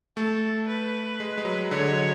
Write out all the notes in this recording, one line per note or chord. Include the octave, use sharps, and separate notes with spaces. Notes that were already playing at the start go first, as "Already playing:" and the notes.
A3 A4
B4
G#3
G#3
F#3
D3 C#5
G#3
F#3